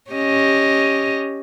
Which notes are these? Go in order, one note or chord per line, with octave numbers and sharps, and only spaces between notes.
C#4 G4 D#5